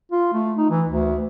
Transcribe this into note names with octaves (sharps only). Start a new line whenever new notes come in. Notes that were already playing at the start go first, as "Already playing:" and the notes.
F4
A3
D#4
E3
D2